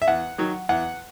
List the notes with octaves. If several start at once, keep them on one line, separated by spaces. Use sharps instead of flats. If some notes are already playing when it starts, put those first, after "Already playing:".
E5
E2 F#5
D#3 F#3
E2 F#5